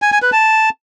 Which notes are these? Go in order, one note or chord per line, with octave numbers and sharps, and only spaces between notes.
G#5
G#5
B4
A5